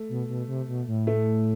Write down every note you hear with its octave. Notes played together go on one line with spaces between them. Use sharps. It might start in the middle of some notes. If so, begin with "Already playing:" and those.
Already playing: A3
B2
B2
C3
B2
A2
A3